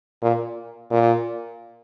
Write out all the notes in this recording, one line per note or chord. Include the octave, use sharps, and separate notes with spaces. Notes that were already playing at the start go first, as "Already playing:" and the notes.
A#2
A#2